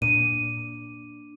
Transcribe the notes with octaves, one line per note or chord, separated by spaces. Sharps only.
A#2 D4 D#7